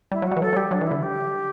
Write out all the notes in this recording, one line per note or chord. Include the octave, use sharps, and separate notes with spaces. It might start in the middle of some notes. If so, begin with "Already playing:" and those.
G3 E4
F#3 F#4
G3
E3
F#3 A4
F#3
G3 G4
F#3 D4
E3
D3 E4
G4